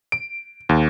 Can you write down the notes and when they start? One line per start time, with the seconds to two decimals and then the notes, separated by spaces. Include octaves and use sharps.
0.12 D7
0.69 D#2